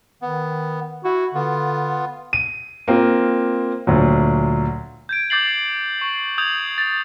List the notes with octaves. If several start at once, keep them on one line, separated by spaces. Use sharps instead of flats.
D#3 B3
E4 F#4
D3 B3 F4
D#7
A#3 C4 F4
D2 A#2 F#3
G6 G#6 D7
D6 G6 A6 C7 F#7
C#6 C7
D#6 G6 G#6 F7 F#7
A6 F7